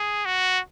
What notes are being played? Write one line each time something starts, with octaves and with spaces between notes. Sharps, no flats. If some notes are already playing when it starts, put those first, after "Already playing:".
Already playing: G#4
F#4